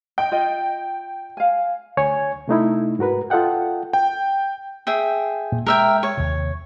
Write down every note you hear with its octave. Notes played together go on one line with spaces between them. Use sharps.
D#5 G5
F4 D#5
F5 G#5
D2 C#5 G#5
C3 A3 D#4 E4
G#2 F#4 A#4 B4
F4 A4 D#5 F#5 G5
G5
G#4 E5 G5
A#2
G#3 A#4 E5 G5
C#5
D#2 C3